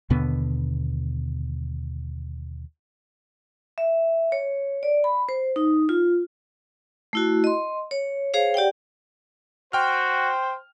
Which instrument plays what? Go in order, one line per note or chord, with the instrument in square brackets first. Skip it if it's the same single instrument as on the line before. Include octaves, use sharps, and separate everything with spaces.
[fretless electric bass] D#2 B2 D3 B3
[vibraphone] E5
C#5
D5
B5
C5
D#4
F4
A3 E4 F#4
D#5 C6
C#5
G#4 C5 C#5 F5
G4 D5 F#5 G5
[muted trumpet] F#4 [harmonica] C5 [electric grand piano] G5 F6